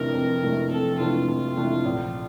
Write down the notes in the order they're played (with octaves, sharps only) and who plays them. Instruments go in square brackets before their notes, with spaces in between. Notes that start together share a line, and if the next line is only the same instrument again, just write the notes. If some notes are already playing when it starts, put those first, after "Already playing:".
Already playing: [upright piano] F2 C3 E3 A3 D4 [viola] A#4
[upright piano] F2
C3 E3 A3 D4
[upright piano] F2 [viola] A4
[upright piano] C3 E3 A3 D4 [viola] F4
[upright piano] F2
C3 E3 A3 D4
A#1